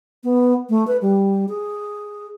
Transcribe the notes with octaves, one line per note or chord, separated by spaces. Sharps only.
B3
A3
B4
G3
G#4